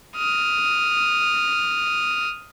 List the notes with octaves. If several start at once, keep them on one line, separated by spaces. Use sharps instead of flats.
D#6 F6